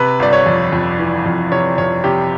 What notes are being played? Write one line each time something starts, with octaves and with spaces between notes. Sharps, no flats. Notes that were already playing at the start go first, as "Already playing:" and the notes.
Already playing: C3 B4
G1 D5
C#5
F2
F2
E3
F2
C3 C#5
F2 C#5
C3 G4